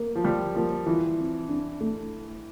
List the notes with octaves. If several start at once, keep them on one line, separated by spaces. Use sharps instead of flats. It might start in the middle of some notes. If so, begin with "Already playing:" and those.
Already playing: A#3
F3
G3 F4
F3 A#3
E3 F4
C4
D4
A3